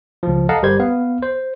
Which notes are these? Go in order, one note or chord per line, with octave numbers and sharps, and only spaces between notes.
C#2 F3
A4 D#5 F5 F#5 A5 A#5
G1 G3 G4 A#4 C5 G#6
B3 F5
C5